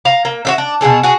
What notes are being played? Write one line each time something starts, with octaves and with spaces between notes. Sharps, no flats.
F5 A#5
A#3
F#4 C5 E5
D4
B2 F3 G#4 A4
F#4 G#4